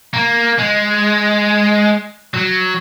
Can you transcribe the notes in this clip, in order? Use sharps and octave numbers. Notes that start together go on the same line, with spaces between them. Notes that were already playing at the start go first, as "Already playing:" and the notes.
A#3
G#3
F#3